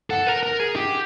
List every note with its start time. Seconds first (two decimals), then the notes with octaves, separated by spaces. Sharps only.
0.10 A4 F#5
0.27 A#4
0.43 A#4
0.60 G#4
0.76 G4